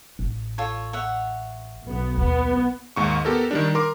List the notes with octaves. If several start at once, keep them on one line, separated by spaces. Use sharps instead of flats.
A1
F4 A4 C#5
C#5 E5 F#5
B1 B3
D#2 B3
D#2 G#2 C#6
B3 G4 A4 A#4
D#3 G3 D4
A#4 C6 D6